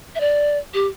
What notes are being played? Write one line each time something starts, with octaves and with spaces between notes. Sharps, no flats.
E5
D5
G4